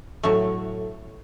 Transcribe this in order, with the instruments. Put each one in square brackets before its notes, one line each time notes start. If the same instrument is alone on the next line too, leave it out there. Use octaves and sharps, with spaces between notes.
[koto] A2 F#3 A3